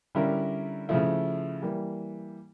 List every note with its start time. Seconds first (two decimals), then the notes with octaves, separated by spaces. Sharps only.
0.15 D3 G3 C#4 E4 A#4
0.89 C#3 F3 A3 E4
1.62 E3 G3 A#3